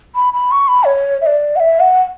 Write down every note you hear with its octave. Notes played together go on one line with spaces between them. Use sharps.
B5
B5
C#6
B5
C#5
E5
D5
F#5
E5
F#5